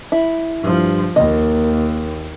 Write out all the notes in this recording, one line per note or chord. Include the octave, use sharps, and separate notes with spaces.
E4
G2 F3
D#2 A#3 D#5